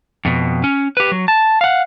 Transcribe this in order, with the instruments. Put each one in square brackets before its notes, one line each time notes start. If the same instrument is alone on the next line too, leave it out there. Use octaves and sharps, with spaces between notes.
[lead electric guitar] F2 B2
C#4
G4 B4
F#3
A5
F5 F#5